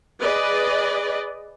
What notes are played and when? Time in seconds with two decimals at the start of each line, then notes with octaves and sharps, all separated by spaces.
0.21 G#4 B4 D5 D#5